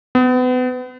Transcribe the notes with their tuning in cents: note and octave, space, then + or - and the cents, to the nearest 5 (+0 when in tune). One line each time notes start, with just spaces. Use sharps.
B3 +35